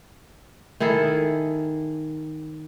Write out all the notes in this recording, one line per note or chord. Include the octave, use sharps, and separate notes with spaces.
D#3 E4 G#4 A4